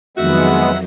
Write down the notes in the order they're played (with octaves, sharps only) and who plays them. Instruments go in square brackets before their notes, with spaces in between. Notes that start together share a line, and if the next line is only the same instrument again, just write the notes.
[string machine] F2 D#3 F#3 [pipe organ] G#3 B3 [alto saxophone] F#4 [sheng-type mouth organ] E5 F#5